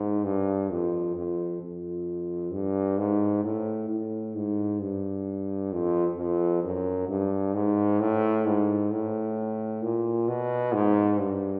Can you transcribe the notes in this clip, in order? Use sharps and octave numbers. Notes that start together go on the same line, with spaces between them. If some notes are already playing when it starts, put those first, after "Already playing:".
Already playing: G#2
G2
F2
F2
F2
G2
G#2
A2
A2
G#2
G2
F2
F2
F#2
G2
G#2
A2
G#2
A2
A#2
B2
G#2
G2